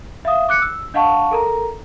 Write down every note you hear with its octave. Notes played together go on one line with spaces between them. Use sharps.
E5 F5 D#6
D6 F#6 C#7
E6
D4 D#5 F5 F#5 A5 C#6
A4 A#4 A#5